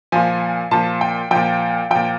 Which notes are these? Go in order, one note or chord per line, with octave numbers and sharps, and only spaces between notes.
A#2 F3 G#5
A#2 F3 A5
G5
A#2 F3 G5
A#2 F3 G5